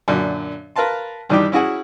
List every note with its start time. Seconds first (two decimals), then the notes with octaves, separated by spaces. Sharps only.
0.08 F#2 A#2 D3
0.76 A#4 B4 F5 A5 C6
1.29 G2 D#3 E3 G3 D4 G4
1.52 C#4 E4 F#4 G#4 F#5